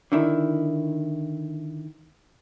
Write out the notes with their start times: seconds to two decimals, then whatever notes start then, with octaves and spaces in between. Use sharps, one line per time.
0.12 D3 D#3 E4